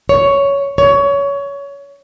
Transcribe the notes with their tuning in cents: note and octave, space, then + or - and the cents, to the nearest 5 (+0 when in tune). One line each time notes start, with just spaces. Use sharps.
C#5 +10
C#5 +20